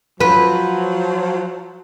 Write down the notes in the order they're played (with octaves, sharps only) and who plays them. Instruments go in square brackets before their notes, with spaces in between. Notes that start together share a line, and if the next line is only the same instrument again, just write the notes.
[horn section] F3 F#3 [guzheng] B4